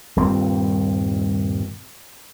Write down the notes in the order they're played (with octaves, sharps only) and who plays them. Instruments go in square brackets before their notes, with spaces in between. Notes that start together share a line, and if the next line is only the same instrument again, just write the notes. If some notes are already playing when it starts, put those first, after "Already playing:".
[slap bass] D#1 G2 C4